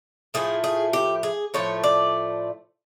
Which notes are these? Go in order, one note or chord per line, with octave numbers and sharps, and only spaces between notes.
A2 F3 A3 G#4
G#4
G4
G#4
A2 F3 A3 C#5
D5